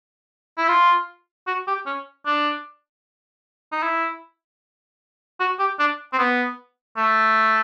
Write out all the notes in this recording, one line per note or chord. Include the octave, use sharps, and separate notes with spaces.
E4
F4
F#4
G4
C#4
D4
D#4
E4
F#4
G4
D4
C4
B3
A3